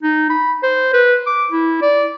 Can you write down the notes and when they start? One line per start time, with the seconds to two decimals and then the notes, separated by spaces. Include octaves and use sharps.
0.03 D#4
0.30 B5
0.63 C5
0.93 B4
1.27 D6
1.51 E4
1.82 D5